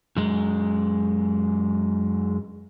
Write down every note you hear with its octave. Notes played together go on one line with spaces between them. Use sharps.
F#2 G#3